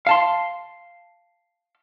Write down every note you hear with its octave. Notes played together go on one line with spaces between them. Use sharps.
F5 A5 C6